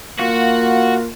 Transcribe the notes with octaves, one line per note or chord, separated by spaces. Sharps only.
A#3 F4 F#4